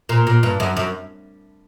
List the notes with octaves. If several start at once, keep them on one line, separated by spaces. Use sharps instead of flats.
A#2
A#2
G2
F#2
F#2